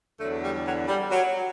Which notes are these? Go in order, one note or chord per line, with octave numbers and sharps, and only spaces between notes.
E2 D3 F#3 A3
G3
F#3
G3
F#3